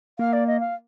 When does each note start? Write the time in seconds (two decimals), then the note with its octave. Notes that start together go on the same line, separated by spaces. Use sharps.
0.19 A#3 F5
0.33 D5
0.47 D#5
0.60 F5